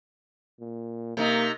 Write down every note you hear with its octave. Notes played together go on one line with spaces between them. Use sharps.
A#2
C3 A#3 D#4